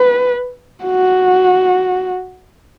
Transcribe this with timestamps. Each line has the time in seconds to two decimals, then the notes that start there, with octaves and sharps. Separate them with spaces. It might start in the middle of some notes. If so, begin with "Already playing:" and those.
Already playing: B4
0.84 F#4